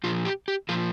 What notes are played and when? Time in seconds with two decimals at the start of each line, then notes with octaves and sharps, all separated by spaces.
0.04 A#2 F3 F4
0.25 G4
0.48 G4
0.69 A#2 F3 F4